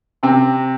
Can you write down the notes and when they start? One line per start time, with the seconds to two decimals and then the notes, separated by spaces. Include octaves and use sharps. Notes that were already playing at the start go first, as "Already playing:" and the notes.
0.23 C3 C4